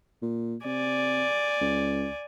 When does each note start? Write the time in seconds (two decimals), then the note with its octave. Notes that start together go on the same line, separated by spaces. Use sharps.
0.22 A#2
0.65 C3 D5 G#5
1.61 C#2